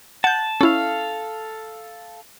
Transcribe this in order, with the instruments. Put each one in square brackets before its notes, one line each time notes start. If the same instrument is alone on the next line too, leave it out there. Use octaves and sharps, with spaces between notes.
[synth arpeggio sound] F#5 G6 [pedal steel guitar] A5
[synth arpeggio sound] C#4 E4 [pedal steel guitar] A4 F5